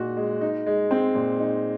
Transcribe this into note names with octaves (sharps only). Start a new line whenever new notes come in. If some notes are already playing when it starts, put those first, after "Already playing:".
Already playing: A#2 G#3 D#4 F#4
G#3
D#4
G#3
C4
A#2
D#4